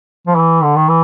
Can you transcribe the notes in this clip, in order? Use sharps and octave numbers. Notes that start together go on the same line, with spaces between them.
F3
E3
D3
D#3
E3